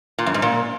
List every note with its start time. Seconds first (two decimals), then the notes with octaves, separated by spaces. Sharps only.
0.19 A#2
0.26 F#2
0.34 G#2
0.42 A#2